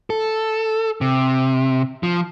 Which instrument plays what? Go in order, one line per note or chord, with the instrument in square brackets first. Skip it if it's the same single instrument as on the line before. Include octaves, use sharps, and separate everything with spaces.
[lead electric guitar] A4
C3
F3